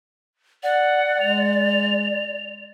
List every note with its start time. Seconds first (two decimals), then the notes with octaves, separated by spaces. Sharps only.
0.63 D5 F#5
1.20 G#3 F7